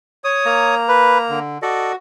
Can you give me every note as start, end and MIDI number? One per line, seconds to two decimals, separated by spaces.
0.24 0.75 73
0.24 0.75 87
0.46 1.39 58
0.46 1.39 82
0.88 1.18 71
1.29 1.58 50
1.62 1.95 66
1.62 1.92 69
1.62 1.92 74
1.62 1.92 75